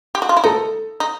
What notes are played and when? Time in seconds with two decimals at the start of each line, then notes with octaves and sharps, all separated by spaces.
0.15 G4
0.22 F#4
0.29 F4
0.37 E4
0.44 D#4 A4
1.00 D#4